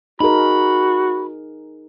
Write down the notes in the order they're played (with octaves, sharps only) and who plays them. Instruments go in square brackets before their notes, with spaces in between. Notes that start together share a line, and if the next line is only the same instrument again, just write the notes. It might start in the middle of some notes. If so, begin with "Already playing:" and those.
[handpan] D#4 G#4 A#4 [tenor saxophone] F#4 [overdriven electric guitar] B5